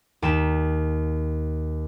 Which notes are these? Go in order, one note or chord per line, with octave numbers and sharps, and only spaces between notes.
D#2 G5 B6 E7